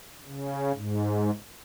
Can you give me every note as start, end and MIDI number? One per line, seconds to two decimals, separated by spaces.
0.24 0.72 49
0.75 1.31 44